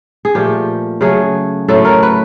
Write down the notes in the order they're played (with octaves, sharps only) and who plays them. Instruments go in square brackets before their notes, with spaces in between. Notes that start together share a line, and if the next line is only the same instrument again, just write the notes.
[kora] G#4
A#2 F3 A3 G4
C#3 F#3 A3 G#4
A2 F#3 A3 A4
A#4
B4